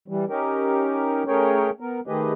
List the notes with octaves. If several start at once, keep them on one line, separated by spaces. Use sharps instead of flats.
E3 G3
C#4 D#4 G4 A#4
A3 C#4 G#4 A#4 C#5 G5
B3 A#4
D#3 A3 G4 G#4 B4 D#5